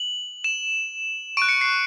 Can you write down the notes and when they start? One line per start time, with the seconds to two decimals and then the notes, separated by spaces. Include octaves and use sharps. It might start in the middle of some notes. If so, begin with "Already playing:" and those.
Already playing: F#7
0.44 E7
1.37 C#6 F#6 D7
1.49 C#7
1.61 C7